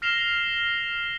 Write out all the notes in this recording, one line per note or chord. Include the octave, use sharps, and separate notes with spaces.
F6 A#6 C7 E7 F7 G7